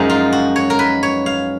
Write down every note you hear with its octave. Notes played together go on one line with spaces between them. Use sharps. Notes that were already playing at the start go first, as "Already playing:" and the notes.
Already playing: F#2 F3 G#3 D#4
F4
F#4
C#5
A#4
B4
C#5
F5